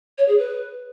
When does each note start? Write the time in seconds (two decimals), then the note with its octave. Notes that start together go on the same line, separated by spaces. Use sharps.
0.18 C#5
0.28 G#4
0.39 B4